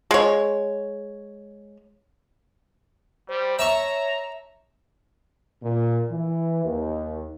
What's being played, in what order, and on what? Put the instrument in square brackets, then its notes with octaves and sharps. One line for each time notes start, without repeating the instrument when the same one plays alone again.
[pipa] G#3 C#5
[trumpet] G3 [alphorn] C5
[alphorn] C#5 [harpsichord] E5 A5 C#6 [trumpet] A#5
[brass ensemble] A#2
E3
D#2